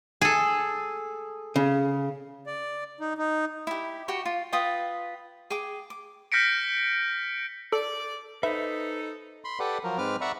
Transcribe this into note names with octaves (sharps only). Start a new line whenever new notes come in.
G#4 A4
C#3
D5
D#4
D#4
E4 G4
F#4 G4 G5 C#6
F4
F4 B4 G5 D#6
G#4 G5 D6
D6
F6 G6 A#6 B6 C#7 D7
A4 D5
D#4 A4 B4 C5 E5
B5 C6
G4 A4 B4 D5 F#5
F3 F#3 A#4
G#2 C4 B4 D6 F6
D5 E5 F#5 A#5 B5 C#6